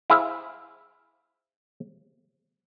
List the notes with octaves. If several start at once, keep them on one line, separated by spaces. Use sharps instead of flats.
E4 G#4 C5 E5 F5